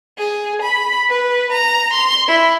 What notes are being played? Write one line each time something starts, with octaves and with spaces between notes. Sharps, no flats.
G#4
B5
B4
A#5
C6
E4